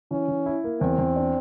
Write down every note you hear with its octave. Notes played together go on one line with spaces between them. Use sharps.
E3 C#4
E3
E4
A#3
E2 C4
E2
D4